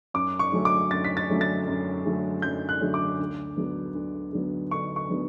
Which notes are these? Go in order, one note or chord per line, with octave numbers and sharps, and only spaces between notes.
F#2 D6
C#6
D3 F#3 A3 C#4
D6
F#2 A6
B6
A6
D3 F#3 A3 C#4
A6
F#2
D3 F#3 A3 C#4
F#2 G6
F#6
D3 F#3 A3 C#4
D6
D2
D3 F#3 B3
D2
D3 F#3 B3
D2 C#6
C#6
D3 F#3 B3